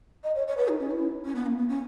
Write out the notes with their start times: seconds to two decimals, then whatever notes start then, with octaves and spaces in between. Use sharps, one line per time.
0.24 D#5
0.35 C#5
0.48 C#5
0.57 B4
0.68 D#4
0.80 C#4
0.91 E4
1.25 C#4
1.35 B3
1.46 A#3
1.58 B3
1.69 C#4